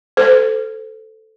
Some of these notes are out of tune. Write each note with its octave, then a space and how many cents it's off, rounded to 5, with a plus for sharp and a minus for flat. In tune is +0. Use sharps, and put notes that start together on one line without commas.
A4 +0 C5 -30